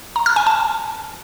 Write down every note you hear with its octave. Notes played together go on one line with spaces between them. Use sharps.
A#5
F6
G#5
A5